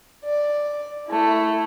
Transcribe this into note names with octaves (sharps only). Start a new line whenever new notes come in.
D5
A3 E4